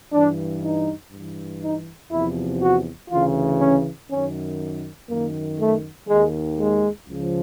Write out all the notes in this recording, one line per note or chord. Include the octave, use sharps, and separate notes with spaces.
G2 E3 D4
D#4
G2 E3
D#4
E2 C3 F3 E4
F#4
D2 C#3 E3 F4
C#4
F#2 D#3 C#4
F#2 D#3 A#3
A3
D#2 D#3 G#3
G#3
C#2 C#3 F3